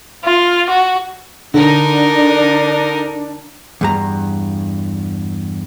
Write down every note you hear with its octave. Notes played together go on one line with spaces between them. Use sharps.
F4
F#4
D3 D4 D#4 A#4
E2 G2 A#5